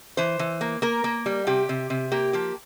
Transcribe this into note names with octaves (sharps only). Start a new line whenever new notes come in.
E3 C5
E3
A#3
A#3 A#4
A#3
G3
C3 G4
C3
C3
A#3 G4
F3 G4